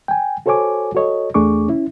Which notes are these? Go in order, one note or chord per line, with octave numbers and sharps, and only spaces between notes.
G5 G#5
F#4 A4 C5 C#5 G#5 D6
F#4 A4 C#5 D#5
E2 A3 D4 G#4 C#6 D6
C#4 E4